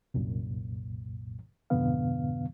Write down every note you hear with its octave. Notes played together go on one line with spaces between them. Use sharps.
C2 F#2 A#2
F2 G#2 B2 D3 B3 F5